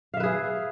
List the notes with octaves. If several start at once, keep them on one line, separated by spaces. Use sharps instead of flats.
G#4 B4 E5 F5